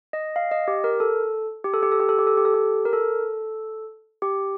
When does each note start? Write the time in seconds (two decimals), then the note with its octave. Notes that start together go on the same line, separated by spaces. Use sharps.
0.13 D#5
0.36 F5
0.51 D#5
0.68 G4
0.84 A#4
1.00 A4
1.64 G4
1.74 A4
1.83 G4
1.92 A4
2.00 G4
2.09 A4
2.19 G4
2.27 A4
2.37 G4
2.45 A4
2.54 G4
2.85 A#4
2.93 A4
4.22 G4